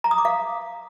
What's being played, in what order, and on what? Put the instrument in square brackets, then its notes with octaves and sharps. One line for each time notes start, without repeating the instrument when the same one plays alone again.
[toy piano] A#5
D#6
D6
F5